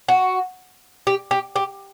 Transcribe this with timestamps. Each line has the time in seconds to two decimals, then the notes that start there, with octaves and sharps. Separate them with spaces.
0.08 F#4
1.07 G4
1.31 G4
1.56 G4